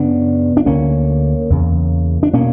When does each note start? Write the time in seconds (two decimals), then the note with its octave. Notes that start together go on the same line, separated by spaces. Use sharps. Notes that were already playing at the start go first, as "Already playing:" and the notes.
Already playing: F#2 C#3 B3 D4
0.57 D4
0.66 D2 D3 A#3 C#4
1.50 E2 C#3
2.23 D4
2.33 B2 A#3 C#4